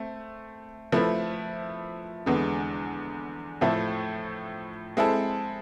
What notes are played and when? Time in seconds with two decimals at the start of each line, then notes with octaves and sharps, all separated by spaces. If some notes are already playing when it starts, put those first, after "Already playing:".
Already playing: A3 C4
0.92 F3 A3 E4 B4
2.26 E2 D3 G#3 B3
3.61 A2 F3 A3 E4 A4
4.97 G#3 C4 E4 A4